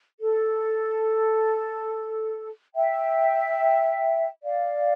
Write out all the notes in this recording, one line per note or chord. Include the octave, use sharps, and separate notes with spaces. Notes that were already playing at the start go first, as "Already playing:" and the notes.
A4
E5 G5
D5 F5